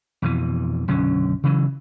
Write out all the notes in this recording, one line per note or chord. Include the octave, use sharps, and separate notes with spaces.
F2 B2 E3
B1 F#2 D3 C#4
C#3 E3 F#3